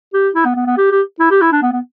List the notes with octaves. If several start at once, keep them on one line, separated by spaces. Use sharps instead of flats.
G4
E4
B3
B3
B3
G4
G4
E4
G4
E4
D4
B3
B3